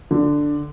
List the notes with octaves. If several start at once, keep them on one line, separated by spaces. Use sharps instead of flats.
D3